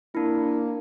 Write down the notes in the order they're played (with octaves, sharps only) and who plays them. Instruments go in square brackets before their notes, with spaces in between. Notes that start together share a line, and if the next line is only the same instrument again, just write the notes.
[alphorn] A#3 [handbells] D4 E4